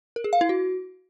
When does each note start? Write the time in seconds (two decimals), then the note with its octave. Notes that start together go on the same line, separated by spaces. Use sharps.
0.16 A#4
0.24 G#4
0.33 F5
0.41 E4
0.49 F#4